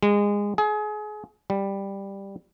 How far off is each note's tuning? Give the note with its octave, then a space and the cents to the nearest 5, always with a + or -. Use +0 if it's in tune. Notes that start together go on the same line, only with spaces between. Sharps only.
G#3 -25
G#4 +30
G3 +5